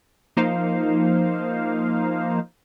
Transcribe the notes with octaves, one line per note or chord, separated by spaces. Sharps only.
F3 A#3 D#4 C5 F5